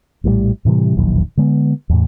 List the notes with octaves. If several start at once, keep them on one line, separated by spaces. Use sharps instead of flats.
A#1 A2 F3 G3
A2 C3 E3 G3
E1 A#1 D#2 F#3
D3 G#3 B3
E2 A2